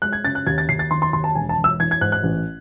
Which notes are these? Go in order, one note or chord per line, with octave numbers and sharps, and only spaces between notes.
G#3 F#6
G#6
C#3 A6
F#6
D#2 G#6
A6
D#2 C7
A6
D#3 C6
C6
D#2 C6
A5
E1 G#5
A5
E1
E6
E3 G#6
G#6
G#2 F#6
F#6
A1